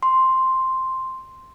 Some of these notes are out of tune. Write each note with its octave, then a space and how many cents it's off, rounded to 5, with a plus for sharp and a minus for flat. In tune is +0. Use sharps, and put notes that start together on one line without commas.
C6 +0